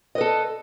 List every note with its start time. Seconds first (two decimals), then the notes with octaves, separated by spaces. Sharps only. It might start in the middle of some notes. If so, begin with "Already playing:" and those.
0.15 D#5
0.18 B4
0.21 A4